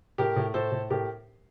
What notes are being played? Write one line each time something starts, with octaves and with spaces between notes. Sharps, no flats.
A2 G4 A#4
A2
A2 A4 C5
A2
A2 G4 A#4